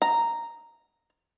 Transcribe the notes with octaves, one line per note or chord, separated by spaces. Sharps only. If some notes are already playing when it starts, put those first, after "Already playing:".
A#5